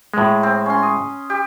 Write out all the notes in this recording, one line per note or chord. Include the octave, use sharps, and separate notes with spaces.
A2 G#3
C4
C#4 C6
D#6
G4